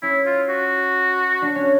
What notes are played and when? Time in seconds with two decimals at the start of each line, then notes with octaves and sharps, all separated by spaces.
0.02 C#4 E4
0.26 F4
0.49 F#4
1.42 D4
1.56 C#4